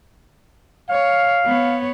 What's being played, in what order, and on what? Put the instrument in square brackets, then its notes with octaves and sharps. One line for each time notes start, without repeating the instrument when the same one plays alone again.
[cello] C#5 [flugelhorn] F5
[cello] B3 C#5